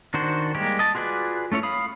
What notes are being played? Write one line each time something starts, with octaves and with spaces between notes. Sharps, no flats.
D#3 D4 F#4 C5
G3 G#3 A#3 G4
D#5 A5
F4 F#4 G#4 B4 D5
A3 C#4 E4 C#5
F5 B5 D#6